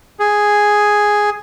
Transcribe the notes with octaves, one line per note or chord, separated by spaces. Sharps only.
G#4